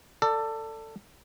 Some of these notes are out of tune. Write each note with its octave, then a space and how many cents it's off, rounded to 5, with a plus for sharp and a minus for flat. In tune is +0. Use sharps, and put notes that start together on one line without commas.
A4 +20 D5 +5